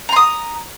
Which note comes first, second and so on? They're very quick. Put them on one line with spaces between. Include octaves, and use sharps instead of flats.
A#5 C6 D#6